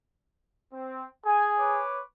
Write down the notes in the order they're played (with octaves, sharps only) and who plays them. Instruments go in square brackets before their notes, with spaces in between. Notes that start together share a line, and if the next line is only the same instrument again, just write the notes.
[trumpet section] C4
[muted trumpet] G#4 [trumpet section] G#5
[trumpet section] B4 C#5 D6